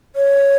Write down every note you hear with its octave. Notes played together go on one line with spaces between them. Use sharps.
C#5